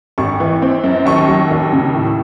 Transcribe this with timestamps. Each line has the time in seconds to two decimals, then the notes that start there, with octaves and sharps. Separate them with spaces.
0.18 G#1 C#6
0.40 E3
0.62 C4
0.84 F#2
1.06 D#2 C#6
1.29 F#3
1.51 D#2
1.73 C#3
1.94 A2